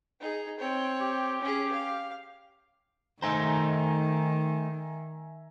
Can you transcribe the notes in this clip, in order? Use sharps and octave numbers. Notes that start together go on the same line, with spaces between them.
D#4 G#4
C4 C#5
G4
C#4 G#4
F5
D#3 A3 D#4 C5 E5 G#5 A#5